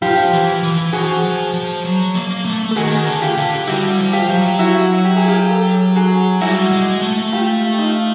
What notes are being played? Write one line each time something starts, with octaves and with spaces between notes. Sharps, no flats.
F3 F4 G4
E3
E3
F3 F#4 G#4
F3
F3
F#3
A#3
A3
A4
D#3 F#4 G#4
D3
F4 G4
D3
G4
G3 E4 F#4
F3
F4 G4
F#3
E4 F#4
G4
G#4
F4 G4
G4 A4
F#4 G#4
G3 E4 F#4
G#3
A3
F4 G4
D#4 F4